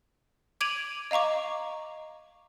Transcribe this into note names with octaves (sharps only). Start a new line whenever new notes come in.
D6 G#6 D7 D#7 F7 F#7
D#5 F5 A#5 C#6 D6